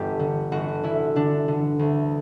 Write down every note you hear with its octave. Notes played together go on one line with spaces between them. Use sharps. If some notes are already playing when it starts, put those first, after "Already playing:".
Already playing: G1 G4
D3
G1 F#4
D3 E4
D3 D4
D3
D2